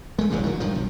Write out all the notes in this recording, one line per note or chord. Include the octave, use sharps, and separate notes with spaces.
G#3 A3
D#1 A1 G2 C#3
D#3 F#3
G2 D#3 F3
B1